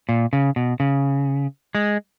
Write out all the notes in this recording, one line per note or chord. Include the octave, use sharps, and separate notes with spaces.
A#2
C#3
B2
C#3
G#3